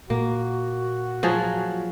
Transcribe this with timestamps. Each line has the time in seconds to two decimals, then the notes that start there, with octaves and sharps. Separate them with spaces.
0.10 A#2 A#3 F#4
1.23 F3 F#3 G#4